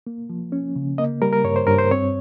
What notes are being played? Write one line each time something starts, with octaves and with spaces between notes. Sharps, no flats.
A#3
F3
C#4
C#3
A#3 D#5
G3 A#4
A#4
G2 C#5
C5
G2 A#4
C5
C4 C#5